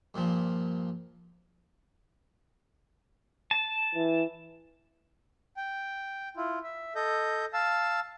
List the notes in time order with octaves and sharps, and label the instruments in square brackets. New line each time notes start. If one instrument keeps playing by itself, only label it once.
[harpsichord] G2 A#2 F3
[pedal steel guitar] A5
[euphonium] E3
[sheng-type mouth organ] G5
E4 F4
E5
A4 D#5 G6
F5 A5 E6